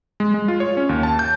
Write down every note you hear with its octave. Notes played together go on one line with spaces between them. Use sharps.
G#3
G#3
F4
C#5
C#4
D#2
A5
G6